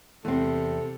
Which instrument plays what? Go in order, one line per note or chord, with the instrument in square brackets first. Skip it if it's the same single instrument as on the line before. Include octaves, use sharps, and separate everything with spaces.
[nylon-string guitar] E2 C4 [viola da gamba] C3 [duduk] A4